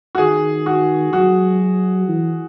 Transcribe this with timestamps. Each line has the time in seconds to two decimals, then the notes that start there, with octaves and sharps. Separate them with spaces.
0.15 F#4
0.18 D#3 G#4
0.66 F#4
1.13 F#3 F#4
2.08 E3